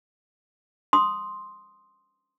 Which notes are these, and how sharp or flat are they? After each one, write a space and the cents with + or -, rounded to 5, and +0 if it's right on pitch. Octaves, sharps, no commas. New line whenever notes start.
C6 +0 D#6 +0